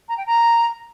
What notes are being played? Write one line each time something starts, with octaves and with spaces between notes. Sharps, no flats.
A#5
G5
A#5